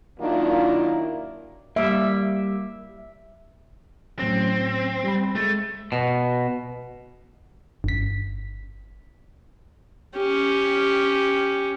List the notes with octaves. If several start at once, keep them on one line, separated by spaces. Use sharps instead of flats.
D#3 F#3 A#3 D4 E4 F4
G3 A#3 E5
A2 F#3 C4 C#4
G3 B5
G#3 A3
B2
G1 B6
C#4 G4